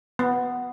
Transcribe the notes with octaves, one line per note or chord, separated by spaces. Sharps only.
B3